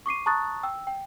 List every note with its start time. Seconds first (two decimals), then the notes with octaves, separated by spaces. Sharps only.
0.06 C#6 D6 C7 D#7
0.26 A5 A#5 C#6 D#6 F#6 A6
0.63 G5 E6
0.87 G5